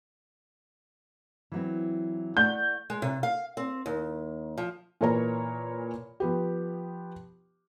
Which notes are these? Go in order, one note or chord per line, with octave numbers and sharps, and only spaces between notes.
E3 F#3 C4
A3 D5 F#5 G6
G#3
C3
F5
C4
D#2
F3
A#2 E3 A#4 C#5 A#5
F3 B3 G4